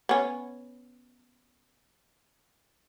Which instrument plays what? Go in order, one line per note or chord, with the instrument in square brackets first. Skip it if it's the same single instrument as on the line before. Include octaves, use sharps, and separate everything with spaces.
[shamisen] B3 C#4